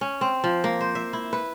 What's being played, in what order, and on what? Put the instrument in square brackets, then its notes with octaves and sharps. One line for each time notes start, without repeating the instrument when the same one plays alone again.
[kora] C#4
C4
F3
A#3
C5
E5
E4
B4